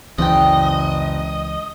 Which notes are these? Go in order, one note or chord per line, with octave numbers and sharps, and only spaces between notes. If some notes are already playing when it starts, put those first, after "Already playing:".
F#1 C#2 E3 D5 D#5 G5